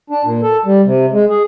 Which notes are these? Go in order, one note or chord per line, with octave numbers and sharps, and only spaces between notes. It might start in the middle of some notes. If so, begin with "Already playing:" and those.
D4
A#2
A4
G3
C3
G#3
G#4